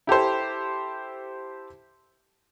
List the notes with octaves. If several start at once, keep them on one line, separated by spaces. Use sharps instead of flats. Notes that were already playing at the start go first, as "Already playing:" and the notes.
E4 G4 A4 C5